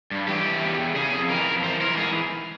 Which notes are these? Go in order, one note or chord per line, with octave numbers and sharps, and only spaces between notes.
G2
E3 G4
E3
E2
E2
C#3 G#4
F2
E3 A#4
F2
E3 C5
E3 A#4
G#2 G#4